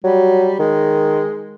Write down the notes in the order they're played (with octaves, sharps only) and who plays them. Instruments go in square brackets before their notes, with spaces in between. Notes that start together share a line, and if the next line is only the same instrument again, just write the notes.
[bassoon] F#3 [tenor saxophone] G3
[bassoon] D#3 [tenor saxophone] G#3